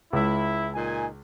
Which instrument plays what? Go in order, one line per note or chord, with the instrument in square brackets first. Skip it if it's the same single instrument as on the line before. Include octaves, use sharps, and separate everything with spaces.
[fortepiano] C#2 [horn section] E4
[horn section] A#2 D#4 G#5